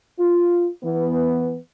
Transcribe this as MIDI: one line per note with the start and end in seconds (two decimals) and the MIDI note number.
0.19 0.66 65
0.84 1.57 52
0.84 1.57 59